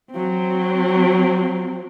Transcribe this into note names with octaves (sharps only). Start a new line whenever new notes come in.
F#3 C4